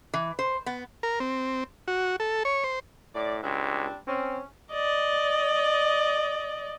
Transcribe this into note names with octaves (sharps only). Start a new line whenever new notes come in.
E3
C5
B3
A#4
C4
F#4
A4
C#5
C5
A2 D5
C#2 G3 C4 D4
C4 C#4
D5 D#5